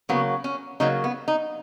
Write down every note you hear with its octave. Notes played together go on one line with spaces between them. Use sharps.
C#3 F#3 A#3 B3
C#4
C#3 F#3 A#3 D#4
B3
D#4